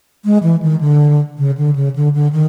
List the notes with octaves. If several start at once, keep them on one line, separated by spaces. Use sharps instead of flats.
G#3
E3
D#3
D3
C#3
D3
C#3
D3
D3
D#3